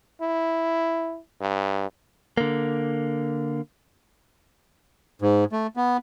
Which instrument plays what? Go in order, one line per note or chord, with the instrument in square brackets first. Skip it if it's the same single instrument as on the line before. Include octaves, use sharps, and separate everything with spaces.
[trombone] E4
G2
[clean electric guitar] D3 A#3
[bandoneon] G#2
A3
B3